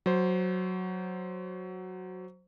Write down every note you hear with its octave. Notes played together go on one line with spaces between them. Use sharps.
F#3 C5